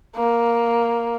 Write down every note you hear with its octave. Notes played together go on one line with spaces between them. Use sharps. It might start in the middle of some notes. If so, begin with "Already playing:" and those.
A#3